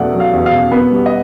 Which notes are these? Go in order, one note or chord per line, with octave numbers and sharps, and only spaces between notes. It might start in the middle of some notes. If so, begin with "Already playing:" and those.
Already playing: E2 B2 F#3 A3 D5 F#5
F#3
F5
E2
F5
B2
B3
G3
D#5